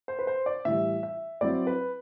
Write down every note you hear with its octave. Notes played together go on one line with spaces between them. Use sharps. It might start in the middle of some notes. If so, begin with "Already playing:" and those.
C5
B4
C5
D5
A2 E3 G3 E5
E5
F#3 C4 E4 D5
B4